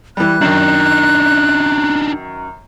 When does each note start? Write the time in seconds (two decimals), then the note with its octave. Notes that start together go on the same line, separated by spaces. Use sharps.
0.17 E3 G3 F#6
0.41 F#2 D#3 D4 D#4